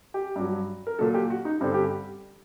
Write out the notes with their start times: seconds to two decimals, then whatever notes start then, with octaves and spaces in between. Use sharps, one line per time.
0.14 G4
0.36 G2 F#3
0.87 A#4
0.99 A#2 F#3 A4
1.14 G4
1.30 F#4
1.45 D#4
1.61 G2 D3 G3 C4
1.74 G4